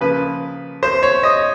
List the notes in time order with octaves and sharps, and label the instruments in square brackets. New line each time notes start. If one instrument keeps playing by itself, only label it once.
[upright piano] C#3 F3 A#3 B4
C5
C#5
D#5